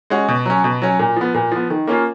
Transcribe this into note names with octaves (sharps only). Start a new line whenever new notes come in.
G#3 C#4 F#4
B2
F#3 C#4
B2
F#3 C#4
A#2
F3 B3
A#2
F3 B3
D#3
A#3 C#4 F4